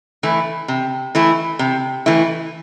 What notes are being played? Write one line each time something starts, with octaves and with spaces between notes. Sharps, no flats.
E3 A3 E4
C3
E3 A3 E4
C3
E3 A3 E4